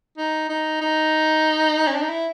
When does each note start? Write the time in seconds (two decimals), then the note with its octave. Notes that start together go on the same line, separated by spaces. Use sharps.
0.18 D#4
0.49 D#4
0.81 D#4
1.87 C#4
1.94 D4
2.01 D#4
2.09 E4